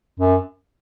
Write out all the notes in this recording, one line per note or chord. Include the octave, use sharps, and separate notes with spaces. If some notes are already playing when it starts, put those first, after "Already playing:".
F#2